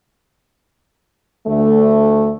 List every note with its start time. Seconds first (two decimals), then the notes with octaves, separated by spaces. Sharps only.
1.47 D2 A3